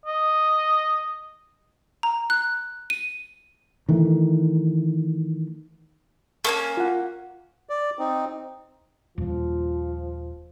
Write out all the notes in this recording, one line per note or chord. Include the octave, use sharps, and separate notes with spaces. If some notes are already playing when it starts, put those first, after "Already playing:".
D#5
A#5
F#6
D#7
D#3 E3 A3
A3 A#3 C#4
F4 F#5
D5
C4 D#4
D#1 F3 F4